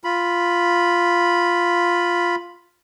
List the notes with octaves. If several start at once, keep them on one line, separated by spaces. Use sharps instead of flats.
F4 B5